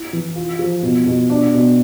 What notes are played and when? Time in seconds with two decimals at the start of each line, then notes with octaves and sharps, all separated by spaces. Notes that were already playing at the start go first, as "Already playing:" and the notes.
Already playing: E4
0.13 E3
0.36 F4
0.59 F3
0.83 B2
1.06 B2
1.30 D4
1.54 B2